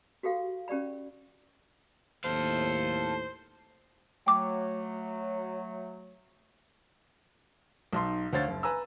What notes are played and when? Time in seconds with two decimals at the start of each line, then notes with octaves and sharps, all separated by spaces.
0.23 F#4 G4 A4 F5
0.68 C#4 G4 D5 B5
2.24 D#2 A2 A4 C5 F5
4.27 F#3 A3 G5 D6
7.93 B1 D#4 C6
8.33 D2 C5 C#5 F5 A6
8.48 F#1
8.63 B4 G#5 A#5 E6